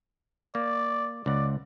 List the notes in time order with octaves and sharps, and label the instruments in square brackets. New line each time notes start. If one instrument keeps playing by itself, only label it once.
[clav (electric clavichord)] A#3 [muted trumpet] D5
[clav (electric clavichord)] C#2 F#5 [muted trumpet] D5